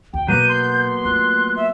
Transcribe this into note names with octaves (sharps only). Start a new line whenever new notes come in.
D2 G5
B2 F#3 A#3 B3 G6 D#7
C6
A3 F4 F#6
E5